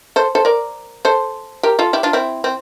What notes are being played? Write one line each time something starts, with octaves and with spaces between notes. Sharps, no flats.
A4 C5
A4 C5
A#4 D5
A4 C5
G4 A#4
F4 A4
E4 G4
D4 F4
C4 E4
C4